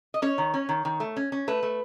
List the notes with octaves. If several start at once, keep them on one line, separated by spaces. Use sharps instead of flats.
D#5
C#4 C#5
D#3
C#4
D#3
D#3
A3
C#4
C#4
A3 B4
A3